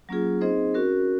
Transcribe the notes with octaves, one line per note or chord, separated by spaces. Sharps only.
F#3 A#3 C#4 F4 G#4
C4 D#4 G#4 C5 D#5
C#4 F#4 A#4